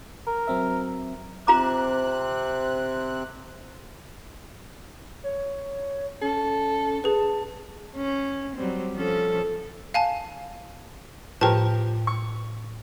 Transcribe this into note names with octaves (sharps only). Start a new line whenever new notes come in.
A#4
F#3 C4 E5
C3 C4 F4 A#5 D6 F#6
C#5
C#4 A4
G#4 B4 A5
C#4
F#3 G3 C4
F3 C#4 A4
F5 G#5 A5
A2 F3 G4 A#4 B4 A5
C#6